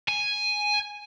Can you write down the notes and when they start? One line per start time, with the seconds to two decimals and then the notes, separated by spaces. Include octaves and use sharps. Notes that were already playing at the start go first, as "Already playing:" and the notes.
0.09 G#5